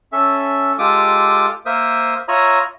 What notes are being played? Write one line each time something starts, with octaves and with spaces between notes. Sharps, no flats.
C#4 A4 E5
G#3 F4 G4 A4 D6 D#6
A#3 A#4 C5 E5 D#6
F4 C#5 E5 A#5 B5 D#6